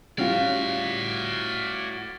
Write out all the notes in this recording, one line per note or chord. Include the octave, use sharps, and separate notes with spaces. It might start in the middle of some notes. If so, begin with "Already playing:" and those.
A2 G3 C#4 F4 F#4 D5 F5